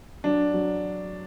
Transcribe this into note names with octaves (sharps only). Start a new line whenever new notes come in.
F#3 D4
F#3